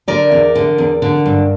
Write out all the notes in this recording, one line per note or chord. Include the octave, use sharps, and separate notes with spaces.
D3 A#4 D5
E2
D3
E2
D3
G2